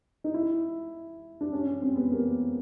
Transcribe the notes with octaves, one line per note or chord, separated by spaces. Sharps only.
D#4
E4
D4
C#4
C#4
C4
B3
A#3